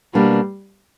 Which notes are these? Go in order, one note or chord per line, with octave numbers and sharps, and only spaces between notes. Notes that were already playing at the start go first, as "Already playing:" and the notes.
B2 G3 A#3 D4